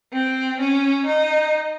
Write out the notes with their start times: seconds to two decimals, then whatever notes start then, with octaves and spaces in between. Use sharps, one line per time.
0.11 C4
0.59 C#4
1.07 D#4